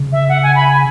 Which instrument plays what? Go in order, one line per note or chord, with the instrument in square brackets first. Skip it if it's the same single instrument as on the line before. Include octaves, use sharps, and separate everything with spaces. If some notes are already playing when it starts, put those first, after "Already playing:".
Already playing: [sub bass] C#3
[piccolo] E5
F#5
G#5
B5
G#5